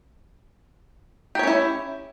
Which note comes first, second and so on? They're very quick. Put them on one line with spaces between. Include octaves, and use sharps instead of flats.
G4 C#5 C#4 E4